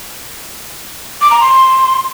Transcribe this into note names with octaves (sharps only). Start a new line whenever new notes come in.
D6
A#5
C6